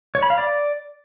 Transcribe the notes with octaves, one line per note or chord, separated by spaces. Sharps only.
C#5
B5
F5
D5